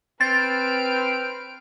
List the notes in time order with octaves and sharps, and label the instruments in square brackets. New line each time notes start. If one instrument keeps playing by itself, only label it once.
[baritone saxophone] C4 [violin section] B4 F6 D7 [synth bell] A6